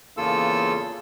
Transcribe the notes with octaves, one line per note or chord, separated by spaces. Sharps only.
E2 C#3 A#3 F4 A4 E6